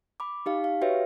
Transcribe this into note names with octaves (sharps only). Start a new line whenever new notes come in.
B5 D6
D#4 G4 F5
F5
F#4 G4 B4 C#5 E5